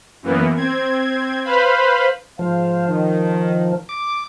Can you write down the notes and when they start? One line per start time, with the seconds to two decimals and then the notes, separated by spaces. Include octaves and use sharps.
0.22 F#2 E3 A#3 B3
0.56 C4 G#6
1.45 B4 C5 F5 B5
2.39 G#2 F3 C5 F5
2.88 D#3
3.89 D6